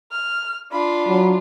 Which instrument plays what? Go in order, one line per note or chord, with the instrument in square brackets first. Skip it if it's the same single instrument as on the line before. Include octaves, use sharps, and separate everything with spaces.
[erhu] F6
[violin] D4 F4 [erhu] B5
[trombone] F#3